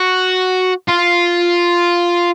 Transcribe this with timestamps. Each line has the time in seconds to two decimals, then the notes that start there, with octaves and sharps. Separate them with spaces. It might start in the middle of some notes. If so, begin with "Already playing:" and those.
Already playing: F#4
0.88 F4